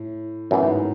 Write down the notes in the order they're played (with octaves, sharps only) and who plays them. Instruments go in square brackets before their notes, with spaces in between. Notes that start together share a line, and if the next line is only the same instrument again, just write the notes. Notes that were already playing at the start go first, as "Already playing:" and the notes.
Already playing: [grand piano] A2
[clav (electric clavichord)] F#2 E3 B3 [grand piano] A2
[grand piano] G#2